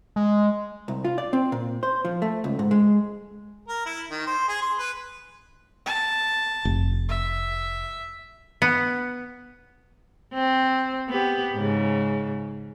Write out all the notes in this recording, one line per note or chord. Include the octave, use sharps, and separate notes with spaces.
G#3
C2
F4
D5
C4
A#2
C5
F3
A3
C#2
G#2
G#3
A#4
E4
D#3
C5
G#4
C6
B4
A5
F1
E5
B3
C4
B3 G4
G#2 C#3